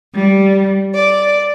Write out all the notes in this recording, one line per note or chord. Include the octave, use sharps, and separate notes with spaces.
G3
D5